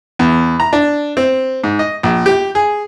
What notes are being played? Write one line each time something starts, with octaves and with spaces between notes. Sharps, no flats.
E2
A#5
D4
C4
G#2
D#5
A#1
G4
G#4